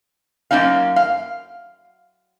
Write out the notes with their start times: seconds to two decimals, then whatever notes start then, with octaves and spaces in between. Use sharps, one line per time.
0.51 F#2 A#3 C#4 D#4 F5
0.96 F5